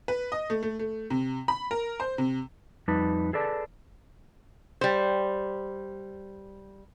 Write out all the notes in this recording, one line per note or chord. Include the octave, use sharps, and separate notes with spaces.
B4
D#5
A3
A3
A3
C3
B5
A#4
C5
C3
F2 G3 D#4 B4 A5
G#4 A4 B4 D5 A5
G3 C5